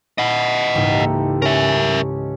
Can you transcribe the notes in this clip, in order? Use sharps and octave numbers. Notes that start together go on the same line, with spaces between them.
E4 D#5 F#5
C#2 G#2 E3 A#3 D#4 G4
A4
C#4 A#4 E5